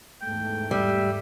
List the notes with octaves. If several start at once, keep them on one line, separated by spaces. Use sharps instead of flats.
E2 G#2 A3 G5
G3 E5